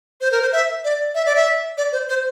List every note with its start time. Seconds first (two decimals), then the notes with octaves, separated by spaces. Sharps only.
0.21 C5
0.32 A#4
0.42 C5
0.52 E5
0.84 D5
1.15 E5
1.26 D5
1.36 E5
1.78 D5
1.92 C5
2.09 C5